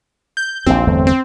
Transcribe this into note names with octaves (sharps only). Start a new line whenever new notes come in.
G6
A#1 D#2 C4
G1 E2 A3
C4